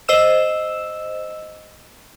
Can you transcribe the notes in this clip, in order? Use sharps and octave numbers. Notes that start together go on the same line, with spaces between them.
C5 D#5 E6 E7